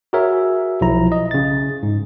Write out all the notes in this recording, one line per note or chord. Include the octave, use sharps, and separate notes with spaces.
F#4 G#4 A#4 C#5 E5
B1 F3 E4 A#5
D#5
C#3 A6
G#2